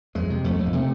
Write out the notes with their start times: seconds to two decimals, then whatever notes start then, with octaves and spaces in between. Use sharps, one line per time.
0.15 F2 G#3
0.30 C3
0.44 F2 A3
0.59 F2
0.66 A#3
0.73 C3 A3